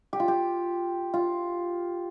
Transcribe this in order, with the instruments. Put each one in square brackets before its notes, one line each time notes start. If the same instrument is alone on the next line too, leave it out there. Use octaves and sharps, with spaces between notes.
[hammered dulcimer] G4
F4
G4
F4